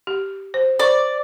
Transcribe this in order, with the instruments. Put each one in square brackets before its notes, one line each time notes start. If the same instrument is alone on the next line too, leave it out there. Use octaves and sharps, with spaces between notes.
[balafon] G4
C5
[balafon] C5 C#6 [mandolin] D5